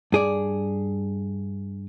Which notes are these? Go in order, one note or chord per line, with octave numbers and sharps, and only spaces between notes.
G2 G#4 D5